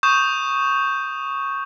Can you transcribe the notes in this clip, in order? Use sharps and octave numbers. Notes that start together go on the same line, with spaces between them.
C#6 D#6 G6 E7